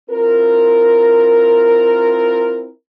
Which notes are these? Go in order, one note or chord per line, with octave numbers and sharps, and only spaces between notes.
C4 E4 F4 A#4